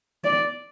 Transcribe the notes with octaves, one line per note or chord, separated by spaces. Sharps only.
D5